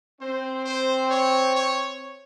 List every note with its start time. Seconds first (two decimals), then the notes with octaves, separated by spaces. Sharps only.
0.21 C4 C5
0.65 C5
1.10 C#5
1.55 C#5